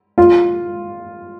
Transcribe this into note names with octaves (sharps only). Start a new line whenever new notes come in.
F4